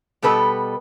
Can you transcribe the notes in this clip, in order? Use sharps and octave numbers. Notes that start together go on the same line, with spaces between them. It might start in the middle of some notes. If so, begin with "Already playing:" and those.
B2 G3 B3 A4 B4